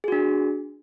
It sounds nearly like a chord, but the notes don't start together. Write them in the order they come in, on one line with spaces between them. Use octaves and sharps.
G#4 F#4 D4